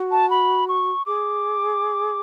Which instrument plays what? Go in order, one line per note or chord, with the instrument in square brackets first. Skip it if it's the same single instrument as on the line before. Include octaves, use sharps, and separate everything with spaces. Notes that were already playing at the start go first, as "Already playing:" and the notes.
Already playing: [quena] F#4
[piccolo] A5
B5
C#6
[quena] G#4 [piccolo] D6